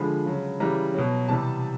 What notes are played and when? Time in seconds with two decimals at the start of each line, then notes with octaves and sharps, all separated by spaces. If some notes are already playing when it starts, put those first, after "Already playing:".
Already playing: D3 F3 G#3 B5
0.26 C#3 F#3
0.60 C#3 E3 G3 A#5
0.94 B2 F#3
1.28 C3 E3 G3 A5